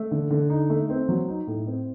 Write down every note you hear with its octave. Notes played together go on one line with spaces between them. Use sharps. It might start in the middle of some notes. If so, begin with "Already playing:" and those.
Already playing: A3
D3
D3
D#4
A3
C4
F#3
D#4
A2
C4